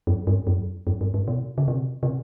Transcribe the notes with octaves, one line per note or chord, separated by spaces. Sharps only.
F#2
G2
F#2
F#2
G2
G#2
B2
C#3
C3
C3